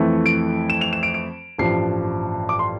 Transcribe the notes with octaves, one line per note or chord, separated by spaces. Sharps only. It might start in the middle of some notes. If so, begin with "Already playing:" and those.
Already playing: F2 E3 A3
D7
E7
F7
E7
D7
D7
A1 G2 F3 C7
D6
C6